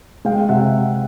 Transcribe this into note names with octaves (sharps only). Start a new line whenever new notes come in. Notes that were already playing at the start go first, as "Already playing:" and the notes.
G#3 F5 G5
C3 E5 F#5